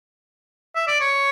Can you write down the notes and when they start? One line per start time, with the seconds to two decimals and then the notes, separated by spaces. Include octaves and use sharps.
0.75 E5
0.88 D5
1.01 C#5